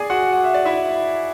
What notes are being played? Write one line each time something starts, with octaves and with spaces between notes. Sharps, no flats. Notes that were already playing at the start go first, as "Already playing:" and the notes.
Already playing: G#4 D5 G#5 D6
F#4 F#5
F#5
E5
D5
E4 E5